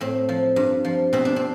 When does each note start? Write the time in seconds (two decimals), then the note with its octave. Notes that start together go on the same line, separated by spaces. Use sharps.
0.01 A2 C4
0.29 F3
0.56 G2
0.85 F3
1.13 B2 C4
1.25 D4
1.36 C4